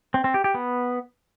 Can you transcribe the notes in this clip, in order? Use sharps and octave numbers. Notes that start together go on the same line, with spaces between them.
C4
C4
G4
G4
B3